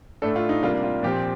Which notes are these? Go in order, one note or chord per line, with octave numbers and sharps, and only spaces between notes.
A2 A3 D4 A4
F4
D#4
C3 G3 A#3 D4 F4
F4
A#2 F3 C4 G4